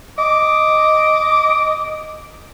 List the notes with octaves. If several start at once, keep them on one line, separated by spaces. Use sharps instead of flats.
D#5 D6